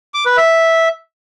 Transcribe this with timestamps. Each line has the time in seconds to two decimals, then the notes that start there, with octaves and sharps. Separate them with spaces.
0.14 D6
0.26 B4
0.37 E5